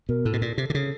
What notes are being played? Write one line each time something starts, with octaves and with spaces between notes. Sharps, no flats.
B2 A#4
A2 A4
B2
A#2
C3
D3
C#3